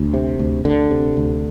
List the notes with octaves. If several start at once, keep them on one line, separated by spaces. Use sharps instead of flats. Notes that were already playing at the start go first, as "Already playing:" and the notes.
Already playing: D2
C3
D2
D2 D3
C3
D2